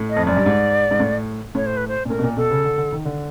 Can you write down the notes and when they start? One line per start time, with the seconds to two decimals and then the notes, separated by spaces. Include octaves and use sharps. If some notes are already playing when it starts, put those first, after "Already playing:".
Already playing: A2
0.10 D#5
0.16 F2
0.27 F#2 D5
0.37 G2
0.46 G#2
0.91 G#2
1.00 A2
1.55 A2 C#5
1.66 C5
1.77 B4
1.88 C5
2.05 A#2
2.09 A2 A#4
2.19 B2
2.24 A#2
2.37 B2 A4
2.51 C#3
2.65 D3
2.78 D3
2.92 D#3
3.05 D3